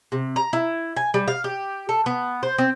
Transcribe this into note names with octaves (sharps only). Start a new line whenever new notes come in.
C3
A#5
E4
G#5
G3
F5
G4
A4
B3
C5
C4